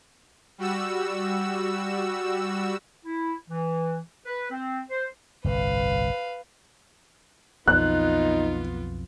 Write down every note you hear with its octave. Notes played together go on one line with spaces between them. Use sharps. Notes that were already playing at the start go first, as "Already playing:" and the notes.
G3 F#4 E6
E4
E3
B4
C4
C5
G1 C2 A2 B4 F5
B1 F2 B3 D#4 F4 F#6